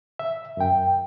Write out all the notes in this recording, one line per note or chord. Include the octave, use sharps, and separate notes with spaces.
E5
F#2 G5